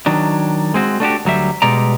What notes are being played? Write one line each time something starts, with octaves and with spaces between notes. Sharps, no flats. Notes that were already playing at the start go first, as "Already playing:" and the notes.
D#3 F#3 D4
G#3 C4 F#4
A3 D4 F#4 G4
D2 F#3 G3 E5
B2 G3 G#3 D5 A#5